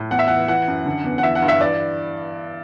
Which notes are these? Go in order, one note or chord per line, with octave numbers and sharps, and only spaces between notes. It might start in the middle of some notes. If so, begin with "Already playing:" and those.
Already playing: A2
E2 F#5
E5
E3 F#5
E3 F#5
F#2
D3
E2
F#5
E3 E5
F#5
G2
E5
E3 D5